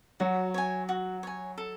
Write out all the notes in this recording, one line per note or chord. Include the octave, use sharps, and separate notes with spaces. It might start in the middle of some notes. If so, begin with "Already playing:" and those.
F#3 F#4
C#5 G#5
F#4
C#5 G#5
A4